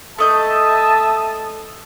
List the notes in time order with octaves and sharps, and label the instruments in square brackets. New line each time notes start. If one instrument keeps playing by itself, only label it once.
[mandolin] A3 D#5 G6 [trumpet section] E5 A5 D#6